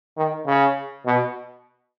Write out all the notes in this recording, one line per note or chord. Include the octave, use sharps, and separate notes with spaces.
D#3
C#3
B2